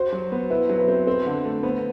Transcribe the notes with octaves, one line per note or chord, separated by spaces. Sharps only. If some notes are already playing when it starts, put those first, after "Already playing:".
Already playing: F#4 C5
F#3
B3
E4 B4
F#3
B4
C4
C4 B4
D3
A3
B3 C5